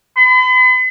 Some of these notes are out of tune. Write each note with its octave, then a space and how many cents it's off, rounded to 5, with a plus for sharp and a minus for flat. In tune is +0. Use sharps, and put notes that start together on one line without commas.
B5 +45